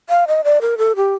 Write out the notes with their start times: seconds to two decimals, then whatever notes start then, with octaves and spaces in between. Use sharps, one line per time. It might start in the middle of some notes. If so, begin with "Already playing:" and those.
0.09 F5
0.28 D#5
0.44 D5
0.61 A#4
0.78 A4
0.96 G4